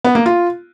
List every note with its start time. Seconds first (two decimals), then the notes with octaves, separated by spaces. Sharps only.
0.04 B3
0.15 A#3
0.26 F4